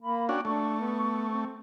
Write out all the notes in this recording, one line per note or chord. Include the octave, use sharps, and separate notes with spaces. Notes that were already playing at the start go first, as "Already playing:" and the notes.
A#3 B5
C#4 D4 F#4 G5
A3 D4 C#6
B3
C4